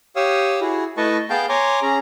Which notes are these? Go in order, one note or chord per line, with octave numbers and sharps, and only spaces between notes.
G4 C#5 F5 D#6 E6
E4 F#4 G#4
A3 E4 B4 D#5 A5 C#6
B3 G#4 F5 G5 A5 G6
C#5 G#5 A#5 C6 D6
C#4 G#4 A#5